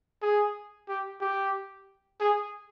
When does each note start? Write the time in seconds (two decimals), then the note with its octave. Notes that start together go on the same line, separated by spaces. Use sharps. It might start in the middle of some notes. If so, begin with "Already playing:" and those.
0.22 G#4
0.89 G4
1.21 G4
2.20 G#4